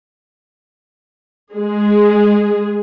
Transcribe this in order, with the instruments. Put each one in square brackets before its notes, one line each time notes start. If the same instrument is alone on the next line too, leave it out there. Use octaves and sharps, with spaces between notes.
[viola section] G#3 G#4